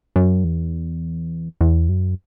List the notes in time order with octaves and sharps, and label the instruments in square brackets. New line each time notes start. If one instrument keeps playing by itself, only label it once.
[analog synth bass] F#2
E2
E2
F#2